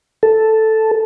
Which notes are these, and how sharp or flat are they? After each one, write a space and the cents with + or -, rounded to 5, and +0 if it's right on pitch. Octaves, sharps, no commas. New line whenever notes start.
A4 +0